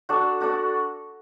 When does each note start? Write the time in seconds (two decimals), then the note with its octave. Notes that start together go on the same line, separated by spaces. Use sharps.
0.09 D4 F#4 A4 D5
0.40 D4 F#4 A4 D5